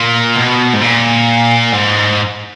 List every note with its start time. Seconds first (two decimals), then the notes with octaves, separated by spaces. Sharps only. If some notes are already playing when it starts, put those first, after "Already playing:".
Already playing: A#2
0.36 B2
0.73 G#2
0.81 A#2
1.73 G#2